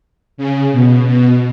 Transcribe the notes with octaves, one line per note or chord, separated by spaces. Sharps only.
C#3
B2
B2